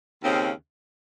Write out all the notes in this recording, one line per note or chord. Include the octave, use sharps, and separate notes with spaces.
D#2 C#3 G#3 C4